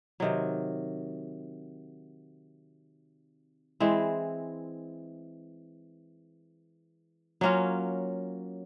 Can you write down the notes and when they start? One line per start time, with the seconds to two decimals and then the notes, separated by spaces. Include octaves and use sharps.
0.20 C3 D#3 F#3
3.80 E3 G#3 C4 E4
7.41 F#3 A#3 C#4 F4